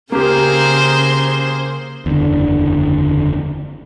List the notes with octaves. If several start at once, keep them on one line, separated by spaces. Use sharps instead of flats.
C#3 A#3 G4 G#4 A#4 C5
F#1 E2 D3